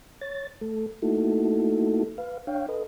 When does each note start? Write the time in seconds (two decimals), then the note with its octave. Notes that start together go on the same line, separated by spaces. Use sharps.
0.21 C#5 A6
0.61 A3 A4
1.02 A3 A#3 D#4 E4 F#4 A4
2.18 B4 F5
2.47 D4 C#5 F5 G5
2.68 A4 B4 D#5